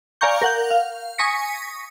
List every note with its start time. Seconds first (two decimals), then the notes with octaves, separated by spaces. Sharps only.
0.21 D5 F5 G#5 A#5 C#6 G6
0.42 A#4 F#5 G6
0.70 F5
1.18 G#5 C#6 D#6 A#6 B6 C#7